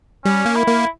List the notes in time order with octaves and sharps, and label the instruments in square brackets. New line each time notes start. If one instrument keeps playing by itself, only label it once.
[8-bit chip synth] G3 [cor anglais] C#4
[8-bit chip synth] A#3
[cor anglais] E4
[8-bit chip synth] A#3